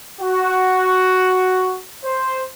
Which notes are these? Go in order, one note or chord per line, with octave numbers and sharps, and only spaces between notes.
F#4
C5